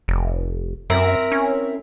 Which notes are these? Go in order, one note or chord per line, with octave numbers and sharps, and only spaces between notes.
F1
F#2 C4 E4 A#4
C#4